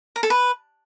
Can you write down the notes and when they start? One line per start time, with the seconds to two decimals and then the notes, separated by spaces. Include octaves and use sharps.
0.16 A#4
0.23 A4
0.30 B4